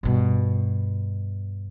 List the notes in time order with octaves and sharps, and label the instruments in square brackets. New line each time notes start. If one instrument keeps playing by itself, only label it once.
[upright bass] G2 B2